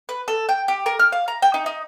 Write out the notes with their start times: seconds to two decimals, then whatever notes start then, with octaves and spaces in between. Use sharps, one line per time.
0.09 B4
0.28 A4
0.49 G5
0.68 G4
0.86 A#4
0.99 F6
1.12 F5
1.28 A#5
1.42 G5
1.54 D#4
1.66 D#4